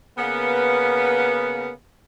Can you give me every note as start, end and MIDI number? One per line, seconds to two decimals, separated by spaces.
0.18 1.71 49
0.18 1.71 58
0.18 1.71 59